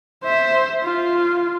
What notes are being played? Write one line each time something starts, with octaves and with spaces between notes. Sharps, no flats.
C5 E5
F4